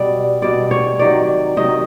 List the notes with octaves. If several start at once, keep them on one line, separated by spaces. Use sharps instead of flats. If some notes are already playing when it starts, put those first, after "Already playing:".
Already playing: B2 G3 D5
B2 G3 D5
C#5
C3 D#3 F#3 D5
C3 D#3 F#3 D#5